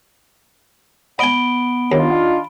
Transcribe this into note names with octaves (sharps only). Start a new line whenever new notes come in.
B3 D#5 G#5 B5 D7 G7
D#2 D4 D#4 F4